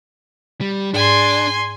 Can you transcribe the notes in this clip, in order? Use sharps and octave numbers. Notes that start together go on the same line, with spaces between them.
G3
G#2 D4 G#5 C6